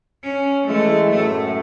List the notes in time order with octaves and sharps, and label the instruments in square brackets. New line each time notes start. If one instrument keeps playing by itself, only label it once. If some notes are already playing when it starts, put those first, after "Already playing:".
[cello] C#4
[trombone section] E3 G#3 [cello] A3
[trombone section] F#2 A2 [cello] A3